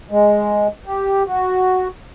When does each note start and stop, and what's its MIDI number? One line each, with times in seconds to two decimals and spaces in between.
0.11 0.67 56
0.86 1.23 67
1.27 1.88 66